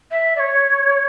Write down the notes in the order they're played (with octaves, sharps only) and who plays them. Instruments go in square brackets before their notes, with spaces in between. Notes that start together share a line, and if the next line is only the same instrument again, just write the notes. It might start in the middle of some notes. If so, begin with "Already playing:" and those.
[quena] E5
D5
C#5